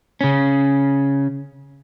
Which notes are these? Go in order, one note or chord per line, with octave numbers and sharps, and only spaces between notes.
C#3 C#4